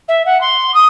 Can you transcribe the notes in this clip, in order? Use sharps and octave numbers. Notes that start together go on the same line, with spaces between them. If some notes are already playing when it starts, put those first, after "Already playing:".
E5
F#5
C6
D#6